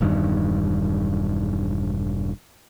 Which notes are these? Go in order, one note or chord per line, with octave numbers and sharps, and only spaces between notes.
E1 G2 D#3